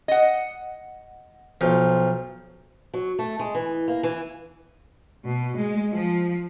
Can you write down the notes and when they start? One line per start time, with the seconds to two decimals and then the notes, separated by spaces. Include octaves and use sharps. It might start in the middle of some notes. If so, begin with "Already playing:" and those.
0.08 D#5 F#5
1.61 B1 F3
2.94 F#3
3.19 A3
3.39 G#3
3.55 E3
3.88 A#3
4.03 E3
5.23 B2
5.56 G#3
5.93 F3